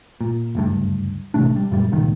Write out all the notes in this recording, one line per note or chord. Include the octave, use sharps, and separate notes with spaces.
A#2
F#1 D2 G2
A1 C3 A3 D4
G3
F#2 A#2 G3
G#1 C#2 A#2 D#3